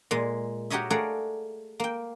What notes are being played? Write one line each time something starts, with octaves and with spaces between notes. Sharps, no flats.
A#2 G#3
F#4 G4 A#4 C#5 D#5 E5
A3 G#4 A#4 D5 F5 F#5
A#3 G5